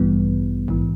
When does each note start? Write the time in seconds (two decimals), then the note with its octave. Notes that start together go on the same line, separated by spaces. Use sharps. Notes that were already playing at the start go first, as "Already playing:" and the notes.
Already playing: A1 G2 E3 G3 B3
0.68 A#1 G#2 E3